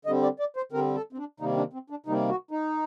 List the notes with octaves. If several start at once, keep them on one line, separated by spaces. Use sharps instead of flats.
D3 G3 C4 D#5
D5
D5
C5
D3 G3 C4 A#4
A4
C4
D4
C3 D#3 G3 A#3 D#4
D4
C4
D4
C3 D#3 G3 A#3 D#4
F#4
D#4